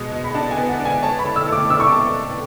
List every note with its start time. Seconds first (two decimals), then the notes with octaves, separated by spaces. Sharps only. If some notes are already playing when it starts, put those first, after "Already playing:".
Already playing: B2 G#3
0.12 B2
0.24 B5
0.35 D4 A5
0.51 G#5
0.58 B3
0.69 F#5
0.79 D4
0.85 G#5
1.03 C#5 A5
1.19 B5
1.25 A4
1.36 E6
1.48 A3 D6
1.69 D4 E6
1.80 C#6
1.87 D6
1.92 A4